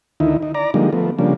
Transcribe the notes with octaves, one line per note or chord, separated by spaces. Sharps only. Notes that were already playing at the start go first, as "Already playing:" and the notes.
D2 D#3 D#4 E4
D#4
D5 A#5
D3 F3 G3 G#3 A#3 D#4
F3 A3 B3
C#3 F3 G3 A#3 D4